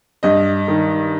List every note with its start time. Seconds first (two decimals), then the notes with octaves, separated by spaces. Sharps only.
0.23 G2 D#5
0.68 D#3